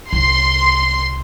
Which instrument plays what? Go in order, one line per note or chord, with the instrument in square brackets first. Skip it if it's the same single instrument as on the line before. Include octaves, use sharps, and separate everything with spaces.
[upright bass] C2 [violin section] C6